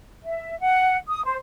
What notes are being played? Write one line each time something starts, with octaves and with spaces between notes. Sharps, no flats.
E5
F#5
D#6
C5